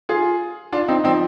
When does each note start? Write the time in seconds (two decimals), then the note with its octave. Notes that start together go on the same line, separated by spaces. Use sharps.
0.09 F4 G#4
0.73 D4 F4
0.88 C4 D#4
1.04 F3 C4 D#4